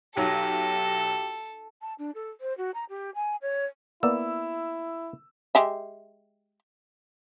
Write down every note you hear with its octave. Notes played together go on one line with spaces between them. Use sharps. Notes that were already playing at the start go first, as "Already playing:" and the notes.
B1 F#3 G4 A4
A5
D4
A4
C5
F#4
A#5
G4
G#5
C#5
A#3 B3 E4 D5 E6
G#3 G4 E5